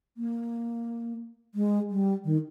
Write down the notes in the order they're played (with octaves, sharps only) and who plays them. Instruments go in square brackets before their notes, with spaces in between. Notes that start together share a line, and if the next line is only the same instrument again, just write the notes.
[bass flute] A#3
G#3
G3
D#3